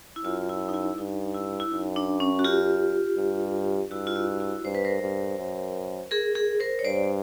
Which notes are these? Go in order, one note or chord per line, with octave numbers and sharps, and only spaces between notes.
E4
F#2 F4
E4
D#4
E4
G2 D#4
E4
E4
F#2 D#4
D4
C#4
F#4
F4 G4
G2
G2 E4 F#4
F4
E4 F#4
E4 F#4
G2 C5
B4
A#4 C5
G2
F#2
G#4 A#4
G#4 A#4
A#4 C5
C#5
G2 C5 D5